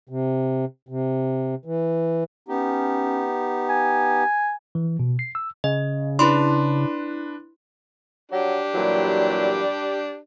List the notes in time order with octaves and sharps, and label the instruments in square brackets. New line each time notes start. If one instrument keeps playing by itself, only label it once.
[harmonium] C3
C3
E3
[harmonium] B3 D#4 G4 [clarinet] C#4
[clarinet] G#5
[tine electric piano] E3
B2
C7
E6
[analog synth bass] C#3 [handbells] D#5
[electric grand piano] D4 B4 [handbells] E4 B5 C6
[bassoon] F#3 [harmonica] D4 G4
[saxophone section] A#2 E3 F#3 [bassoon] G3